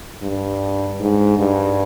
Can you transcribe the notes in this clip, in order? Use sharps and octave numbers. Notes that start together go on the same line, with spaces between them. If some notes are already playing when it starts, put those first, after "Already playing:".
G2
G#2
G2